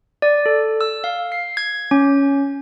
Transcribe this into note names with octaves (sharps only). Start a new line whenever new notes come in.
D5
A4
E6
F5
C7
G#6
C#4